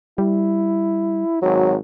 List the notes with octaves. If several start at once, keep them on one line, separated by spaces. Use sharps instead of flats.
G3 E4
G#1 F#3